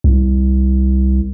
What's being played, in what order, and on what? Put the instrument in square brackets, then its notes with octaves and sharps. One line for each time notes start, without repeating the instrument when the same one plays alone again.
[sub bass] C2